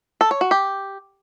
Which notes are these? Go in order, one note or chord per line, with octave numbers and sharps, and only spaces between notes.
A4
C#5
F#4
G4